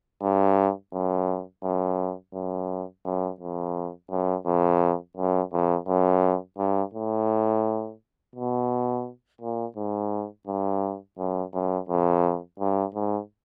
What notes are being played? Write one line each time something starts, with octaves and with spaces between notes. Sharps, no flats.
G2
F#2
F#2
F#2
F#2
F2
F#2
F2
F#2
F2
F#2
G2
A2
B2
A#2
G#2
G2
F#2
F#2
F2
G2
G#2